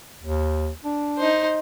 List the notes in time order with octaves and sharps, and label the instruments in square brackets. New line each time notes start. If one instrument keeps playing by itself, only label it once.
[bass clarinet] D#2
D4
[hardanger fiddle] D#4 C5